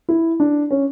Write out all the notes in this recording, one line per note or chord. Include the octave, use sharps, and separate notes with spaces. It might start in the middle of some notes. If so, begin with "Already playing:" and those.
E4
D4
C#4